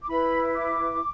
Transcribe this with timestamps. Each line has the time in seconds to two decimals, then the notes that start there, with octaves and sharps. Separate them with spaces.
0.03 D6
0.08 E4 B4 B5
0.55 D6